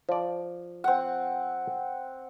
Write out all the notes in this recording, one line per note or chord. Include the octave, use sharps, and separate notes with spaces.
F3 D5
C4 F#5